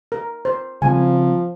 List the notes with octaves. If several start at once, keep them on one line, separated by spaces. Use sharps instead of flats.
A#4
C5
C#3 F3 G3 C4 G#5